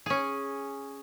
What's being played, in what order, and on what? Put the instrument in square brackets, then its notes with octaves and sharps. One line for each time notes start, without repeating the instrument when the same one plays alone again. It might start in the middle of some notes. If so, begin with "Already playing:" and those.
[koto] C#4 G#4